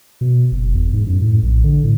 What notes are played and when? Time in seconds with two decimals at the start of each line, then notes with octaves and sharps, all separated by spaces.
0.21 B2
0.52 F#1
0.74 E2
0.93 G#2
1.07 F#2
1.21 A2
1.43 A#1
1.64 D3
1.84 A2